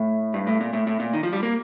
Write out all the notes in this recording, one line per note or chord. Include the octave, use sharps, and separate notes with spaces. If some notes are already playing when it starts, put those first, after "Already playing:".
Already playing: A2
G2
A2
A#2
A2
A2
A#2
D#3
F3
G3
A#3